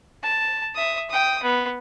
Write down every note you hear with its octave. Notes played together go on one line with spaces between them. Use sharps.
A5
E5 D#6
G5 D#6
B3